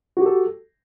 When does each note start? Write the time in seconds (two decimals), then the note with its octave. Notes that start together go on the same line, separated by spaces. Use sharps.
0.17 F#4
0.21 G4
0.26 A4